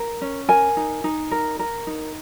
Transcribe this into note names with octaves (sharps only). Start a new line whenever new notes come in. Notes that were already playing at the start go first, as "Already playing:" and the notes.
Already playing: A#4
C#4
A#4 G#5
D#4
D#4
A#4
A#4
D#4